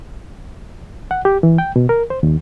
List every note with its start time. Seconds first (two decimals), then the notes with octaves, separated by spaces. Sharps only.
1.11 F#5
1.25 G4
1.43 E3
1.58 G5
1.76 B2
1.89 A#4
2.10 C5
2.23 D#2